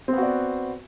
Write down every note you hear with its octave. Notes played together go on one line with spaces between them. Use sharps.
B3 C4 F#4 D5